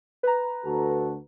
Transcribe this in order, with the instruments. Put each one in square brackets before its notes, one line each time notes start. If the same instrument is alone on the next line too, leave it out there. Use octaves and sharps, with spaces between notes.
[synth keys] B4 A#5
[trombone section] D2 F#4 A4